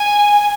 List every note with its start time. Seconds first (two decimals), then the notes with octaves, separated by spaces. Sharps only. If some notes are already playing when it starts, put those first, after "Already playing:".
Already playing: G#5